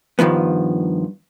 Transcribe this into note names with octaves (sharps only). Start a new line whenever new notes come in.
G2 D#3 F3 B3